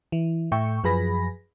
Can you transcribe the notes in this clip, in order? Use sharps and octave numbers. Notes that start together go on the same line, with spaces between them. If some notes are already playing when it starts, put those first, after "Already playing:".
E3
A2 E5 G5 C#6
F#2 F3 G#4 B4 B5 A#6